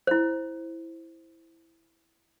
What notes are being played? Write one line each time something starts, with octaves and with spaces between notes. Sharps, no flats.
E4 C5